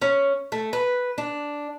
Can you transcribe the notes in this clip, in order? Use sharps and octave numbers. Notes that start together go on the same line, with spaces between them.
C#4
A3
B4
D4